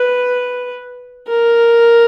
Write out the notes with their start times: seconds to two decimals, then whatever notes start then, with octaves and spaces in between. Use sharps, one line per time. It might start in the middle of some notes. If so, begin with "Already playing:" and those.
Already playing: B4
1.28 A#4